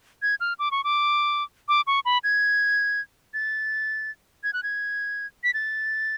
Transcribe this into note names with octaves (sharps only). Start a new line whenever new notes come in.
G#6
F6
D6
C#6
D6
D6
C#6
B5
G#6
A6
G#6
F#6
G#6
B6
A6